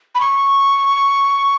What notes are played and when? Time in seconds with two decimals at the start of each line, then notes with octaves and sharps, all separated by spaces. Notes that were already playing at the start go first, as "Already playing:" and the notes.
0.15 B5
0.21 C#6